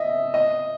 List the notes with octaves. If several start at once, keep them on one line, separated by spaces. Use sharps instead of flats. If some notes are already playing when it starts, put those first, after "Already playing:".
Already playing: D#5 E5
D#5